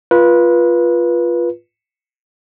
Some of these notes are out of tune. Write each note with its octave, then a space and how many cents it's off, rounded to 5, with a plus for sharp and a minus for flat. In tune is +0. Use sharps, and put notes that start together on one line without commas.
F4 -5 B4 -20